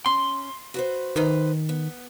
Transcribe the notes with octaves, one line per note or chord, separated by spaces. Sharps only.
C#4 C6
F#4 B4 C5
D#3 D#4 B4 C5
B3